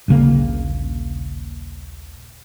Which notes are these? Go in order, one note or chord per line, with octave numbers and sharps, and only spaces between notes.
D#1 A#1 C#3 A#3